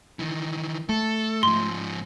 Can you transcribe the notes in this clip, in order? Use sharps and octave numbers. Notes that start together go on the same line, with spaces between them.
D#3 E3
A3 A4
G#2 F3 C6